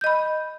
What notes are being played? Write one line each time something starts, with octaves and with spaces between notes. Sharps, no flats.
D#5 B5 G6